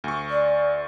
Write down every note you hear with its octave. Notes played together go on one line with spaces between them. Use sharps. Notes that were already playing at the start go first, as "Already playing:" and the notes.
D2 C#6
D5